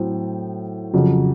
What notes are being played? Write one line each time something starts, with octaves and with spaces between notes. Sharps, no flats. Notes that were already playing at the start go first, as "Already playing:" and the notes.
Already playing: A2 F#3 C4
F2 C#3 F#3